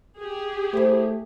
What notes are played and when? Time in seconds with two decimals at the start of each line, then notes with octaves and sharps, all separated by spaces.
0.19 G4 G#4
0.73 A3 E4 C5